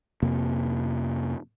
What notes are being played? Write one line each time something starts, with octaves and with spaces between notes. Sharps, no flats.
F2 C3 A#3